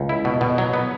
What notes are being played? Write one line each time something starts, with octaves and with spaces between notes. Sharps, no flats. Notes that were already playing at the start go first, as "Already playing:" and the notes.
Already playing: C#2
E4
B2
B2
F#3
B3